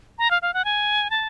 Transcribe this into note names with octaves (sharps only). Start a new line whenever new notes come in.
A#5
F5
F5
F#5
G#5
A5